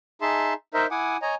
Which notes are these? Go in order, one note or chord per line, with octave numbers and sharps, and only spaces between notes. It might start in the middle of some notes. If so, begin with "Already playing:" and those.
D#4 G#4 E5 A5 C6
D#4 A#4 C5 D#5 E5
E4 F#5 G#5 D6 D#6
C#5 D#5 G#5 A#5